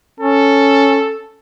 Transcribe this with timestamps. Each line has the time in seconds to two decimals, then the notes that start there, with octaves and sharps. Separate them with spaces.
0.20 C#4 A4